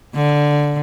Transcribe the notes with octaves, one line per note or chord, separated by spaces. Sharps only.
D3